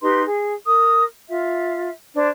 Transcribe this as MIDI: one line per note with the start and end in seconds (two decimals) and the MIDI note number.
0.01 0.23 63
0.01 0.23 67
0.01 0.23 71
0.01 0.23 84
0.24 0.53 68
0.65 1.03 70
0.65 1.03 87
1.28 1.89 65
1.28 1.89 76
2.14 2.27 62
2.14 2.27 72
2.14 2.27 73